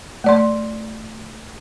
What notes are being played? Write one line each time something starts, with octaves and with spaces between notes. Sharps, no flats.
A3 D5 C6